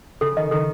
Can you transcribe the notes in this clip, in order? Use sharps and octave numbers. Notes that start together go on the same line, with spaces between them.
C#3 A4
D#3 D#5
D#3 A4